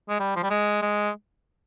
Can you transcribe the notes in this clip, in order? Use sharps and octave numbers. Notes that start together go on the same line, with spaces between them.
G#3
G3
F3
G3
G#3
G#3